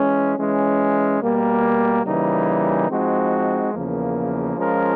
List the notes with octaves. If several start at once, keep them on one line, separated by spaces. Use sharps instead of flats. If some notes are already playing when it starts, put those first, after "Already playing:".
Already playing: E3 G#3 C#4
E3 G#3 C#4
B2 G3 A#3
C#3 E3 G3 A#3 D#4
F3 G#3 C4 D#4 F#4
E2 C#3 F3 A#3
F3 G#3 C#4 F4 A#4